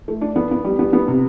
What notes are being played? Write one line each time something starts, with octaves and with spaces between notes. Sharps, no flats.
A3
D4
B3
B3
G3
B3
B3
C3